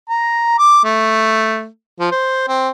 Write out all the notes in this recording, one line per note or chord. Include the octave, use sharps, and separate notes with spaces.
A#5
D6
A3
F3
C5
C4